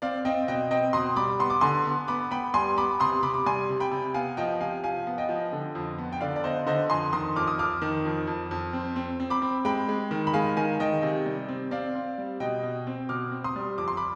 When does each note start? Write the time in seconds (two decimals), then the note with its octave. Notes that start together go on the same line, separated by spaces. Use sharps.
0.02 C4 D5 F5
0.25 C4 D#5 G5
0.48 B2 D#5 G5
0.71 C4 D#5 G5
0.93 B2 C6 D#6
1.16 G3 B5 D6
1.39 B3 C6
1.50 D6
1.61 D3 G#5 C6
1.86 B3
2.08 B3 B5 D6
2.31 B3 G5 B5
2.54 G3 G#5 C6
2.77 B3 B5 D6
3.00 C3 C6 D#6
3.23 C3 B5 D6
3.34 D6
3.46 G3 G#5 C6
3.69 C3
3.80 G5 B5
3.91 C3
4.14 B3 F5 G#5
4.37 F3 D#5 G5
4.60 C3 F5 G#5
4.84 F3 F5 G#5
5.07 B3
5.18 D#5 G5
5.29 F3
5.52 D3
5.75 F2
5.98 B3
6.13 G5
6.21 D3 D5 F5
6.36 D5
6.44 B3 C5 D#5
6.67 D3 C5 D#5
6.90 F2 G#5 C6
7.13 D#3 C6 D#6
7.36 F2 D6 F6
7.47 D#6
7.58 F2 D6 F6
7.82 D#3
8.05 F2
8.27 F2
8.51 F2
8.73 C4
8.96 C4
9.20 C4
9.30 B5 D6
9.42 C4
9.65 G#3 G5 B5
9.89 G#3
10.11 D#3
10.27 B5
10.34 G#3 F5 G#5
10.57 D#3 F5 G#5
10.80 D#3 D#5 G5
11.02 C3
11.26 G3
11.48 C4
11.71 C4 D5 F5
11.95 C4
12.18 G3
12.40 B2 D#5 G5
12.63 B2
12.87 C4
13.09 B2 D6 F6
13.32 C4
13.44 C6 D#6
13.56 G3
13.78 F2 D6
13.88 C6
13.97 B5 D6